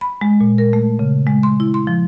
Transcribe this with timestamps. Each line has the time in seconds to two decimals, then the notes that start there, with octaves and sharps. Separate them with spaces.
0.01 B5
0.21 G#3
0.40 A#2
0.58 A#4
0.73 A3
0.99 C#3
1.27 G#3
1.43 C6
1.60 E4
1.74 C6
1.87 F3